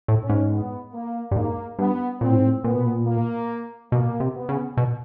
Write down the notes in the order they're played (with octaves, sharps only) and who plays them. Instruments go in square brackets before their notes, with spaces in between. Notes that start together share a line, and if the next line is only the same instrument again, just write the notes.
[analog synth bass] A2
[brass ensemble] C#4
[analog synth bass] G#2
[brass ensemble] B3
A#3
[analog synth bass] G2
[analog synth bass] G#2 [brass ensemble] A#3
[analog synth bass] G2 [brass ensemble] B3
[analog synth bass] A#2 [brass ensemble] C4
[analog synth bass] A2
G#2
A2
[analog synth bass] A#2 [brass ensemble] B3
[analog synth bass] B2
A#2
[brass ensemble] A#3
[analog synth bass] B2 [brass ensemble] A#3
[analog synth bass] C3
[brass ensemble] B3
[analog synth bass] C#3
B2